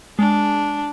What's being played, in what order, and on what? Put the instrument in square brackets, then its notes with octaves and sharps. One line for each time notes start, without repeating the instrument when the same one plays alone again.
[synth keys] G#3 [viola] D4